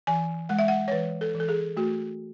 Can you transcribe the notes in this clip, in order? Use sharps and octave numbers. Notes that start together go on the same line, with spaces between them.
E3 G#5
G#3 F#5
E5
F#5
C#5
E3 B4
A4
E3
A4
G#4
A3 F#4